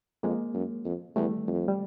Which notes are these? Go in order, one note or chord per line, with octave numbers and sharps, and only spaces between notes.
F2 G#3 A#3
F#2
F2
E2 G3 A3
F2
G3